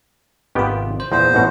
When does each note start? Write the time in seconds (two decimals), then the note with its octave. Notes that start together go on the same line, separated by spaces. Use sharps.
0.55 G#1 C3 D#3 B3 F4 G4
1.00 C5
1.12 E2 A#2 B3 C5
1.34 A1 B2 F#4